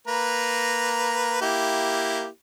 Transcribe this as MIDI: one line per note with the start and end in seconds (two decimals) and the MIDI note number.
0.07 1.39 58
0.07 1.39 71
0.07 1.39 82
1.41 2.27 58
1.41 2.27 64
1.41 2.27 67